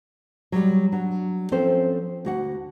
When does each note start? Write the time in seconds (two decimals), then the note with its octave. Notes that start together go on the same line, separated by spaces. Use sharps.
0.52 F#3 G3
0.92 F#3 D4
1.52 F3 C4 C#4 A4 C5
2.25 D2 F#4 F#5